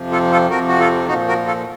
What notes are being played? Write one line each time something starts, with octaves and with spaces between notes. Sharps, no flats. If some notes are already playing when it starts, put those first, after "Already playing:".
Already playing: F2 C3 F3
F4 A4
F4 A4
F2 C3 F3 F#4 A#4
F#4
F4 A4
A#2 F3 D#4 F#4
F#4 A#4
F4 A4